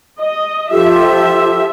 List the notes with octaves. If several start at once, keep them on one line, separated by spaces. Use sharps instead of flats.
D#5
F3 F4 G4 A4 E5